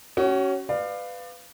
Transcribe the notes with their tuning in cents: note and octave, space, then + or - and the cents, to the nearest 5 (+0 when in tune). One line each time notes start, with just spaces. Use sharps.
C#4 +0 F#4 +35
B4 +20 D5 +30 F5 +0